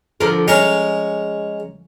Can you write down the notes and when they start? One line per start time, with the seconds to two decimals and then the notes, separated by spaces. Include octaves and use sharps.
0.20 D3 F3 A#4
0.48 G#3 C#4 A#4 C#5